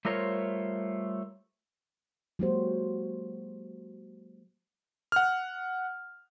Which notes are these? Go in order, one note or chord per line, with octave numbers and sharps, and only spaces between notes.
G3 A3 F4 A#4 C5 C#5
F#3 G#3 A#3 F#4 G4 C5
F#5 F6